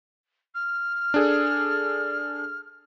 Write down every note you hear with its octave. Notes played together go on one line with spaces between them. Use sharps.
F6
D4 G#4 A4